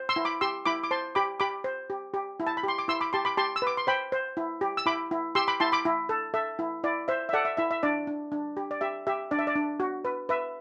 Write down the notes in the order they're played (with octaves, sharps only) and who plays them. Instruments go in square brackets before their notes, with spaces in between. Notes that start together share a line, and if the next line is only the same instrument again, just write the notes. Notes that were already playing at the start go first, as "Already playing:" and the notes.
Already playing: [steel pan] C5
C6 E6
E4
B5 D6
G4 C6 E6
E4 B5 D6
D6
C5 A5 C6
G4 B5 D6
G4 B5 D6
C5
G4
G4
E4
A5
B5
G4 C6
D6
E4 C6 E6
B5 D6
G4 A5 C6
B5 D6
G4 A5 C6
E6
B4 D6
C6
C5 G5 B5
C5
E4
G4
E6
E4 B5 D6
E4
G4 C6 E6
B5 D6
E4 A5 C6
B5 D6
E4
A4
A4 E5
E4
E4 D5
C5 E5
E5
A4 D5 F#5
E5
E4 E5
E5
D4 D5
D4
D4
G4
D5
G4 E5
G4 E5
D4 D5
E5
D5
D4
F#4
B4
B4 E5